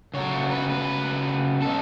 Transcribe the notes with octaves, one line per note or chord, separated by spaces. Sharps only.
C#3 F#3 A3 C#5
B4
B4
B2 G#3 A4